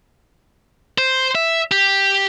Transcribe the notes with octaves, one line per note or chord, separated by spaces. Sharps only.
C5
E5
G4